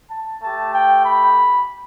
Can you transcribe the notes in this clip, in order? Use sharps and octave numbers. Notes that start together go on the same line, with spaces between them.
A5
A3 G4 A5
G5
B5